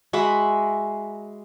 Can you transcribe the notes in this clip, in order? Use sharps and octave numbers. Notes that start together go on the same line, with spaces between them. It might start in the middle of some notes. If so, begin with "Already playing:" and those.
G#3 F#4 E5 B5